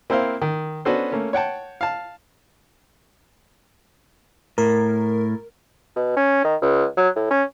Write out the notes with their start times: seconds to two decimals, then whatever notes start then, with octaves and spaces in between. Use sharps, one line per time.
0.10 A#3 C4 E4 C5 F5
0.42 D#3
0.85 B3 C#4 D4 F#4 A4 C5
1.12 A3 A#3 C#4
1.33 C#5 F#5 G5 A5
1.81 F5 A5
4.58 A2 A#4
5.96 B2
6.17 C#4
6.44 D#3
6.62 C#2
6.97 F#3
7.16 A2
7.31 C#4